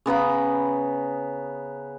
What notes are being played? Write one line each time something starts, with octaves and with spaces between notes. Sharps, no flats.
C#3 B3 A#5 B5